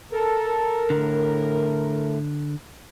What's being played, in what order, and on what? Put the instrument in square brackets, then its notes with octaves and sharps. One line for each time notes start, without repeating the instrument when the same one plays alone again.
[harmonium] A4 [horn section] A#4
[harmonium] A2 [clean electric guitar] D3